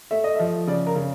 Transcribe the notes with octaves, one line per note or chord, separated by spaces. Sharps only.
A3 E5
D#5
F3 E5
C#3 D5
A#4
C#3